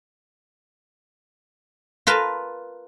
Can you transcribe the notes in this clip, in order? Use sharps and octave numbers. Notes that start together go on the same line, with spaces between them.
F4 A#4 B4 A5